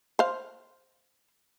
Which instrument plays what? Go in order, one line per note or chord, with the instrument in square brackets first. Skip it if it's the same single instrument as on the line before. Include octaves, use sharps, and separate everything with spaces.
[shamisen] C5 F5